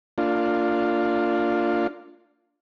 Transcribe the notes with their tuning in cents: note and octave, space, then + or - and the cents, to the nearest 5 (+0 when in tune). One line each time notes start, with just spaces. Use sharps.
A#3 -30 D4 +0 F4 +0